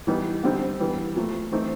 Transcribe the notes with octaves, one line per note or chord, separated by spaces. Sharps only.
E3 G3 B3 D#4
D3 G3 C4 D#4
E3 G3 B3
A#2 F3 A3
E3 A3 C4 D#4